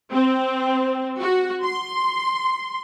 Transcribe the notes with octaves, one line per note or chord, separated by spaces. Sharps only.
C4
F#4
C6